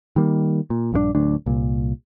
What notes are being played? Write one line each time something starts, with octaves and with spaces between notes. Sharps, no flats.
D#3 G3 A#3
A#2
A#1 G2 G3 D4
D1 D2 D4
C2 A#2